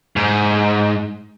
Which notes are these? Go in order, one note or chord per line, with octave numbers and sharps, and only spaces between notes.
G#2